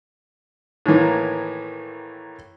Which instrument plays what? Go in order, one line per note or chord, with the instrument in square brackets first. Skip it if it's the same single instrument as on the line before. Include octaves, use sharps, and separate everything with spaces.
[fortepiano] A2 D#3 E3 A#3